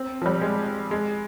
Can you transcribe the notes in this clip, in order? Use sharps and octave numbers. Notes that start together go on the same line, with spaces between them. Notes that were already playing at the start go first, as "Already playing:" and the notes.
Already playing: C4
F3
G3
G#3
G#3